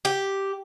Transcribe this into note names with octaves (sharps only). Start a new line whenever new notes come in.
G4